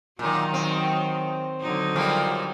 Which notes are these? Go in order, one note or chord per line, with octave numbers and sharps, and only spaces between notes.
A#2 D#3 F#3
C4
D3 F#3 D#4
F3 G3 A#3